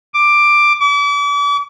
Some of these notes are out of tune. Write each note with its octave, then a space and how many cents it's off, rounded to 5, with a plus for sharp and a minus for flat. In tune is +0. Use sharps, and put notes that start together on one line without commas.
D6 +10
D6 -40